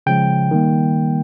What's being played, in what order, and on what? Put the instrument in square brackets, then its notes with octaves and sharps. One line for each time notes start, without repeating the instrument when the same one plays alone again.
[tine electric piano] C#3 F3 G#3 G5
D#3 G3 A#3